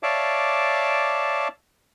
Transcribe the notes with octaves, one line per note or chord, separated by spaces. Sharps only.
C#5 D5 E5 F5 A5 D6